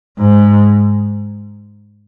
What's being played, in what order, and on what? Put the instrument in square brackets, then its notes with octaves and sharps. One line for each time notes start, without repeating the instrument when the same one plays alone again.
[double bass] G#2